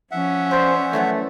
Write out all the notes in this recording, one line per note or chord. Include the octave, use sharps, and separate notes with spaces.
F3 C#4 E5 F#5
B4 C5 D5
E3 F#3 A3 C#4